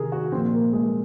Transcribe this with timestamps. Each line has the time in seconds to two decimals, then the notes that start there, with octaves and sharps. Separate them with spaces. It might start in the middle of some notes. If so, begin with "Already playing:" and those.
Already playing: C3 D#3 G#4 A#4
0.12 F#4
0.32 A#2 F3 C4
0.53 A#3
0.73 G#3